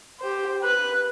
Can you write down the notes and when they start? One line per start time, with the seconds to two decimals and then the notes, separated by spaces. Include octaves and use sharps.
0.19 G4 C5
0.62 B4 F#6